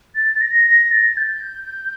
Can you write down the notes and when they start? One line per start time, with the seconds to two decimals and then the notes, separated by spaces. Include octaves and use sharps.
0.15 A6
0.36 A6
0.41 A#6
0.66 A#6
0.91 A6
1.17 G6